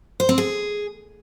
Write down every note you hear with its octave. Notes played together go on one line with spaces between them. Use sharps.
C5
C4
G#4